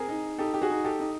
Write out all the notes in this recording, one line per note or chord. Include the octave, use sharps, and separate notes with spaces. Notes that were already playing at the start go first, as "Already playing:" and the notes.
Already playing: C4 G#4 A#4
D#4
D#4 G4 A4
G4
F#4 G#4
D#4
G4 A4
D#4